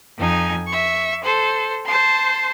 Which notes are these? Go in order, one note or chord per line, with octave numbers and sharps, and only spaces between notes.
F2 D#4 G#5
E5 C#6
A4 C5
C5 A5 C6